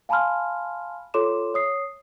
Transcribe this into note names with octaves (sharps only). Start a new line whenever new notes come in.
F5 G#5 A5 B5 C6 F6
F4 A4 C#5 C6 D6 E7
C#5 D#6 C7